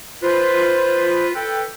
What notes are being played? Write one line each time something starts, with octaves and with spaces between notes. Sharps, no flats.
F4 B4 C5
A4 B4 G5